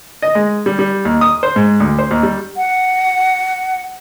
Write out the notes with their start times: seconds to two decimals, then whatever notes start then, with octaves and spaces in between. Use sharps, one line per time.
0.22 D#5
0.35 G#3
0.66 G3
0.79 G3
1.05 D#2
1.21 D#6
1.43 C5
1.56 G#2
1.80 D2
1.99 C5
2.11 D#2
2.23 G3
2.57 F#5